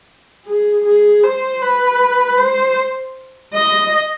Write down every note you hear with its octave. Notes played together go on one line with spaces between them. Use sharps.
G#4
G#4
C5
B4
C5
D#5